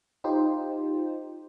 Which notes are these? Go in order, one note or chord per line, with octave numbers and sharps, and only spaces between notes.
D#4 F4 G4 C5